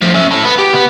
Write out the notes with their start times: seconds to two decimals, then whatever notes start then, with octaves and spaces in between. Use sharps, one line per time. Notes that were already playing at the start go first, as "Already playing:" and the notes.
0.02 A2 F3
0.14 C#4 E5
0.31 E4 A4
0.45 B3
0.59 G4
0.74 B3